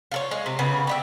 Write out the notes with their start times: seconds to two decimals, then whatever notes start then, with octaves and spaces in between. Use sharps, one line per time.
0.12 F4 A4 C#5
0.31 G#3
0.46 C3
0.59 C#3 B3
0.87 G4 D#5 E5